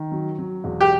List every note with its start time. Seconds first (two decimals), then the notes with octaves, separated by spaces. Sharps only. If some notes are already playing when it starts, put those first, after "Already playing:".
Already playing: D#3
0.12 F#3
0.38 F#3
0.64 E1
0.81 G4